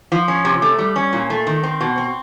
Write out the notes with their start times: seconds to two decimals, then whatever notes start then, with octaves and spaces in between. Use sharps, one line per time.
0.12 F3
0.28 C#4
0.45 C3
0.62 A3
0.78 G3
0.96 C#4
1.13 A#2
1.30 A3
1.47 D#3
1.63 C4
1.81 B2
1.98 C4